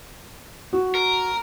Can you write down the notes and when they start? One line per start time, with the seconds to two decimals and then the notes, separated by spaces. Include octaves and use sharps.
0.73 F#4
0.95 A#4